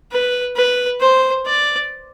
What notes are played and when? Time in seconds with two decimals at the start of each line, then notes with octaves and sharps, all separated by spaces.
0.12 B4
0.56 B4
1.01 C5
1.46 D5